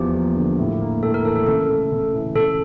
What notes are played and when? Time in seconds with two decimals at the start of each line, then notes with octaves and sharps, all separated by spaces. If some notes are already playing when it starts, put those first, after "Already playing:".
Already playing: E2 F3 G4
0.15 A#3
0.36 D3
0.58 A2
0.81 A#3
1.03 A2 A4
1.14 A#4
1.25 E3 A4
1.36 A4
1.47 C#3 A4
1.69 A3
1.92 C#3
2.14 E3
2.35 C#3 A4